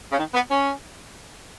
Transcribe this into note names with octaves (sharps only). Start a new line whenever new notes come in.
C#3
D#3
B3
C#4